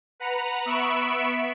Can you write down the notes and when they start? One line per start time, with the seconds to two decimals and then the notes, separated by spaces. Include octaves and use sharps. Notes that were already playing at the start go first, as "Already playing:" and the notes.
0.20 B4 F#5 A#5
0.65 B3 E5 B5 C#6 D7 E7